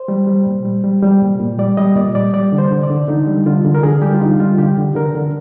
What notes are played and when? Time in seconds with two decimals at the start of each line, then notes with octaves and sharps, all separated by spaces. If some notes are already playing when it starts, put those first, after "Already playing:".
Already playing: C5
0.08 G3
0.27 G3
0.46 A#2
0.65 G3
0.84 G3
1.03 G3
1.21 A#2
1.40 A#2
1.59 G3 D5
1.77 G3 D#5
1.96 A#2 D5
2.15 G3 D5
2.33 G3 D5
2.52 D3
2.58 C5
2.71 D3
2.83 D5
2.89 D3
3.08 D3 D#4
3.27 G3
3.46 D3 F4
3.65 D3
3.75 A#4
3.83 D3 G#4
4.02 G3 G4
4.14 F4
4.21 D3 D#4
4.40 G3 F4
4.58 D3 G4
4.77 D3
4.95 D3 A#4
5.15 D3